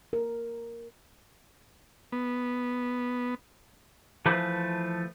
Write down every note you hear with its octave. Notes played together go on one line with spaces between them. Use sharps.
A#4
B3
E3 F3 A3 B4 C5